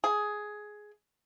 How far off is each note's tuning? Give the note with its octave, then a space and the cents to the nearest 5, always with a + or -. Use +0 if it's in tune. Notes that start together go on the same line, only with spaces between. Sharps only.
G#4 +10